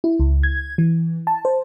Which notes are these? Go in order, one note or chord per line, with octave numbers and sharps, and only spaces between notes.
E4
C#2
G#6
E3
A5
C5